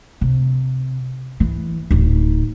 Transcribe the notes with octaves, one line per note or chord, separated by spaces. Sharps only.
C3
E3
D1 D#4